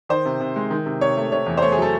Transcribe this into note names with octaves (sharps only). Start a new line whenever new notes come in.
D#3 C5
C3
C3
G#3
D#3
C3
C3 C#5
A3
C3 C#5
E2
C5
A3 C#5
G#4
F#3 A4